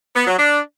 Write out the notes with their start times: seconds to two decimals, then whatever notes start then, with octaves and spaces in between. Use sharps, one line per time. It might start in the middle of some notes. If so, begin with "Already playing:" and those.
0.14 B3
0.26 F#3
0.38 D4